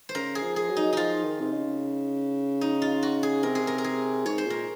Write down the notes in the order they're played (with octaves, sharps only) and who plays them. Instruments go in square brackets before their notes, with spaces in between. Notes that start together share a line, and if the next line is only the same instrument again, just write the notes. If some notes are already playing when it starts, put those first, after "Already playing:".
[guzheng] C5
[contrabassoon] C#3 [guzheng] A#4
[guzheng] G#4
[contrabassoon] F3
[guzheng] G#4
[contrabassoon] F#3
[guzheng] D#4
[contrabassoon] F3 [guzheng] D#4 F4
[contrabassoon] D#3
C3
C#3
[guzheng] D#4
F4
F#4
G#4
[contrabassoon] C3 [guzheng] A#4
[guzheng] G#4
A#4
A#4
G#4
[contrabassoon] G#2 [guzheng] C#5
[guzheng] C5
[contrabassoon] A#2 [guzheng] A#4